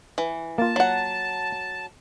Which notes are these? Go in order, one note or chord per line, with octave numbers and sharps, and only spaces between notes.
E3
A#3 F4 A5
F#3 F#5